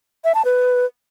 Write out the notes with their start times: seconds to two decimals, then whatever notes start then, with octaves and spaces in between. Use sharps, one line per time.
0.24 E5
0.35 A5
0.45 B4